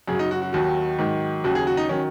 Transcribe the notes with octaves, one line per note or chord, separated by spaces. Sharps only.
F#2 C#3 F#3 G#4
D#4
F#4
F#4
D#2 D#3 F#3 F#4
G#2 D#3 F#3
D#2 C#3 F#3 F#4
G#4
F#4
D#4
D#3 F#3 C#4